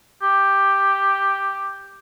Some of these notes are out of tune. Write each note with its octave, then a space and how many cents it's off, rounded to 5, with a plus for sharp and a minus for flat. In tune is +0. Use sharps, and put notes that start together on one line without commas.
G4 +5